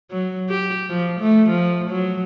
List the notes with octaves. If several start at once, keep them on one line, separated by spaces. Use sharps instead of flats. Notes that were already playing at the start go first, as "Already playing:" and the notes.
F#3
G4
F3
A3
F3
F#3